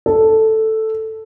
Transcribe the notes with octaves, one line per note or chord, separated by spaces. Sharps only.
A4